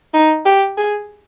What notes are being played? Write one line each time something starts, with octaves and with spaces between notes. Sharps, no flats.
D#4
G4
G#4